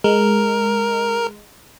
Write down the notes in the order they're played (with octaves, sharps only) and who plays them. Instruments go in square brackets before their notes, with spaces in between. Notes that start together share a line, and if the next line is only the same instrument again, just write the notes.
[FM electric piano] G#3 [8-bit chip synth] A#4